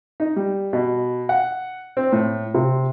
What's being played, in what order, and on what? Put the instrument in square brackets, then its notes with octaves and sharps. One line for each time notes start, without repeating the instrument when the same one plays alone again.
[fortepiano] D#4
G3
B2
F#5
C4
A2
C3